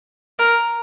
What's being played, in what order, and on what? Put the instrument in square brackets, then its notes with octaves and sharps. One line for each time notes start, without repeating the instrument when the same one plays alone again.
[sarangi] A#4